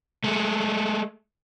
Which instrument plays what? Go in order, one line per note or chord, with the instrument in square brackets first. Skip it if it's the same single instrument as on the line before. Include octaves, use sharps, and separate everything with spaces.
[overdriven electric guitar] G#3 A3